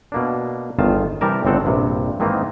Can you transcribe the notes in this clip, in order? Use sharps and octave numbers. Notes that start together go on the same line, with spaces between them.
B2 A#3 D4
G1 E2 D#3 F4 A5
C3 E3 G3 G4 A#4 A5
G1 C#3 C4 A4 F#5
A#1 G2 C3
G#2 D#3 E3 A#3 C4 D#4